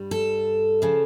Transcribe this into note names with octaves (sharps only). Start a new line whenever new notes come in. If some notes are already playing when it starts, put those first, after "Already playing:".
Already playing: G2 G3
A4
C#3 F3